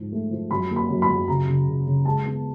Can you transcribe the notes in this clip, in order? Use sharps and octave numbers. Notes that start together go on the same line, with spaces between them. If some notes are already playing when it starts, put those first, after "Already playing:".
Already playing: G#2 F3
A3
F3
F#2 B5
A#3
B5
F#2
B5
F#2
C#3 A#5
C#3
C#3
C#3
G#3 A5
B3